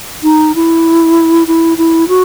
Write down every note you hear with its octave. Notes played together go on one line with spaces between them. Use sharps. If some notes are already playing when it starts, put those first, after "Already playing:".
D#4
E4
E4
E4
F#4